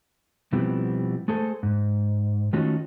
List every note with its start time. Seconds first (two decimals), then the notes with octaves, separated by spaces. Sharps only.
0.53 B2 F3 G3 B3 C4 E4
1.28 A3 G#4 A4 C5
1.63 G#2
2.53 D#3 A3 C#4 D#4 F4 F#4